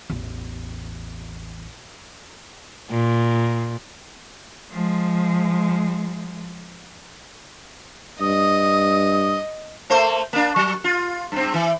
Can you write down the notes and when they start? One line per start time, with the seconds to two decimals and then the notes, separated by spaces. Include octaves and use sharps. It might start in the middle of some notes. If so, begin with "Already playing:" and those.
0.10 A1 E2
2.91 A#2
4.72 F3 G#3
8.21 G2 D#5 D#6
9.90 A3 A#3 C5
10.33 A#3 D4
10.56 F#3
10.84 F4
11.32 G2 C4
11.54 E3